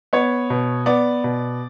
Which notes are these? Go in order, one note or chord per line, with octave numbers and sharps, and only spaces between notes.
B3 C#5
B2
B3 D5
B2